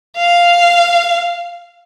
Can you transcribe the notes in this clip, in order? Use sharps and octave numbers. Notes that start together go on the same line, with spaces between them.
F5